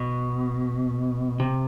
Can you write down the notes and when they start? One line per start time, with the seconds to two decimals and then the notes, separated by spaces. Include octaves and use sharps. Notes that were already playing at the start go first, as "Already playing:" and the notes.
Already playing: B2
1.40 C3